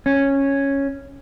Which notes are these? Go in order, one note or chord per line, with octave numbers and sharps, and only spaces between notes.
C#4